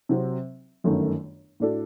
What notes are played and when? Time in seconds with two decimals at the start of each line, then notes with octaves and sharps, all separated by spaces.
0.09 C3 F#3 C4
0.84 G1 F#2 D#3 A3
1.60 A2 A3 D4 F#4 A4